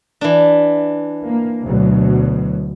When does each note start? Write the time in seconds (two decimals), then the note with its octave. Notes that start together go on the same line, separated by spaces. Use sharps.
0.21 E3 D4
1.26 A#3
1.65 D2 B2 F#3